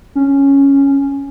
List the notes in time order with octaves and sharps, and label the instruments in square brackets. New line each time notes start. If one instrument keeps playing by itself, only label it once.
[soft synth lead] C#4